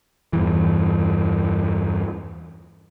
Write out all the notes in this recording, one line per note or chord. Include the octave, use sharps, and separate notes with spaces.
E2 G2 E3